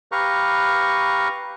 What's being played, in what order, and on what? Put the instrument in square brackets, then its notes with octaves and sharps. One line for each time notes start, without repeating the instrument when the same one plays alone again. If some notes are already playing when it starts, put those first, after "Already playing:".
[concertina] G4 B4 F5 A#5 C#6